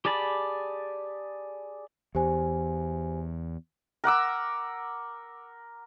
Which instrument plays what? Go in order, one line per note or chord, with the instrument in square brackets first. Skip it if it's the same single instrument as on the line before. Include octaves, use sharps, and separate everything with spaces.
[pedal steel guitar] G4 G#4 D5 A5 B5
[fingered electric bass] E2 [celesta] G4 C5 G#5
[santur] A#4 F#5 D6 E6